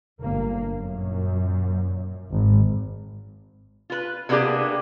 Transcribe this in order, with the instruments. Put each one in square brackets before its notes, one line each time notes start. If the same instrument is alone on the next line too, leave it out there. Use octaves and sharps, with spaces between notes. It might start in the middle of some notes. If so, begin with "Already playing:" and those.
[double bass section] G1 A#3
F#2 A#2
G#1 G#2
[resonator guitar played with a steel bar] F4 B4
C3 A#3 B3 D4 G4 G#4